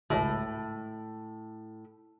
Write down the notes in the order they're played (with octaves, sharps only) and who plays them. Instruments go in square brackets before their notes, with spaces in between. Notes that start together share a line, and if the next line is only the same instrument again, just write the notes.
[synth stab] G#1 C#2 [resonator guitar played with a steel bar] A2